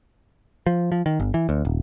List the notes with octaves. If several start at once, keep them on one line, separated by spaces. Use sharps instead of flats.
F3
F3
D#3
G1
E3
D2
D#1